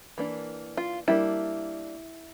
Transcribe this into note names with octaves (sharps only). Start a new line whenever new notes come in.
E3 A#3 D4
F4
G3 A#3 D4 E4